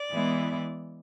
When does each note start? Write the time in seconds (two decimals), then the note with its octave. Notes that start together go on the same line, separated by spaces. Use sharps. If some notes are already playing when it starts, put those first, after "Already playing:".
Already playing: D5
0.12 E3 G#3 B3 E4